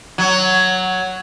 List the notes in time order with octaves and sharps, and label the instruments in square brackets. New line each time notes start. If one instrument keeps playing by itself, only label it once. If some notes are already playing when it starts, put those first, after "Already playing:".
[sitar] F#3